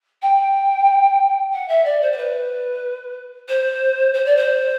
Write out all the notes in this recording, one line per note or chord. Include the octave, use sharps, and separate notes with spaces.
G5
F#5
E5
D5
C5
C5
B4
C5
C5
D5
C5